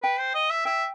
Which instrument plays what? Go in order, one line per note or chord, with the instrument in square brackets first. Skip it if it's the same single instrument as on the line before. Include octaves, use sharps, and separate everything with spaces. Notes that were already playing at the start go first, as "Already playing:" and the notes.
[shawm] B4 [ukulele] G5
[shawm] C5
D#5
E5
[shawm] E5 [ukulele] G5